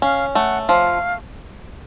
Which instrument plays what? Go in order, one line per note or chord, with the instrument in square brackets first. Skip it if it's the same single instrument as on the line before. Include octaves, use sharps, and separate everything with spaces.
[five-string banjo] C#4 [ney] F5
[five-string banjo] A3 [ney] F#5
[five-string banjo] F3 [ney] F5